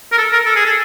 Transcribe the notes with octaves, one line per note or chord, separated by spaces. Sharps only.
A#4
A4
A#4
A4
G#4
A4